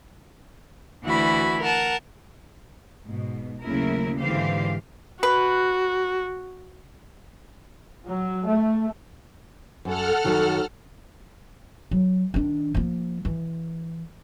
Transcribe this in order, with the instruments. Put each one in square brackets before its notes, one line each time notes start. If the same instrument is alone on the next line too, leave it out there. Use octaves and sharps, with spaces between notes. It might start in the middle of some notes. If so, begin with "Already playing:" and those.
[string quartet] D2 E3 E4 F#4 B5
A#4 F#5 A5
[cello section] G#2 B2
D#2 C#3 F#3 A3 E4 A#4
G#2 D3 E3 G4 C5 F5
[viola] F#4 [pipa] B4
[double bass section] F#3
A3
[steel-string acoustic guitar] F#2 [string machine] A4 F#5 F6
[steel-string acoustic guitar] F#2 D#3 F#3
[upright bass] F#3
D#3 D4
F3 A#3
E3